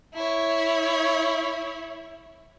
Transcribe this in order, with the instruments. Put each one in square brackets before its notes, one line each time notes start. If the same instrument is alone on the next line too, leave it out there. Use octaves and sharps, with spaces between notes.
[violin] E4 C#5